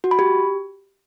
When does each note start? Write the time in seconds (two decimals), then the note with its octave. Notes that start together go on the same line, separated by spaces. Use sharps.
0.04 F#4
0.11 B5
0.19 G4